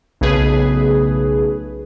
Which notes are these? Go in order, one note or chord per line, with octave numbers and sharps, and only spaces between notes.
B1 C#3 A3 G#4 B4